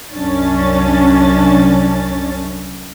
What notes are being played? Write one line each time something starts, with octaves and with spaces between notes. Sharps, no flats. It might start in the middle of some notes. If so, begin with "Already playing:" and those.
C2 F#2 C#4 D4 A6